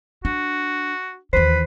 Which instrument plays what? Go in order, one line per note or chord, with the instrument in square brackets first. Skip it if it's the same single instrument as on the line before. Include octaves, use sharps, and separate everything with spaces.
[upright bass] D4 [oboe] F#4
[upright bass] D#2 E3 [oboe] B4 [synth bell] C5